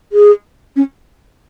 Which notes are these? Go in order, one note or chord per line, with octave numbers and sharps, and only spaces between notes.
G#4
C#4